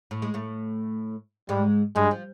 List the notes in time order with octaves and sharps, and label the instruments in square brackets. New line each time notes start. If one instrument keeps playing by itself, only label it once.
[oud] A2 A3
G#3
A2 A3
[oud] G#2 G#3 [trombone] G3
[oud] G2 G3 [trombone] G#3
[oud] F3